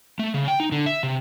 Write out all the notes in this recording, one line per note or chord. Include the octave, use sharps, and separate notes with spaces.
A3
C#3
G5
D#4
D3
E5
C3